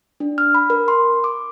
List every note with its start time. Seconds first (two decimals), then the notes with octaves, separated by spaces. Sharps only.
0.20 D4
0.38 F6
0.55 B5
0.70 A#4
0.88 C6
1.24 D6